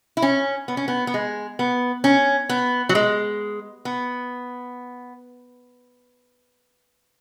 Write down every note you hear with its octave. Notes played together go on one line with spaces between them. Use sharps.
E4
C#4
B3
C#4
B3
B3
G#3
B3
C#4
B3
F#3
G#3
B3